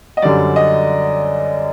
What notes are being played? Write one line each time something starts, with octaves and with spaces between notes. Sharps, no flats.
D#5
F#2 D3 G3 D5
D#5